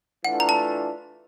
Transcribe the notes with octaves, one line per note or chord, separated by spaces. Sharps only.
E3 A3 D4 F4 F#5
A#5
A5